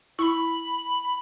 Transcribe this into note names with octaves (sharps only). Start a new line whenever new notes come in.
E4 B5 C#6